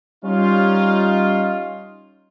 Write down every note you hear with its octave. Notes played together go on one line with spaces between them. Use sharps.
G3 C#4 D#4 F4